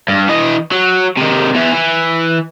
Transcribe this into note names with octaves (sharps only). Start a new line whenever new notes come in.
G2
E3 D#5
F#3
C3 D#3
E2 E3
E3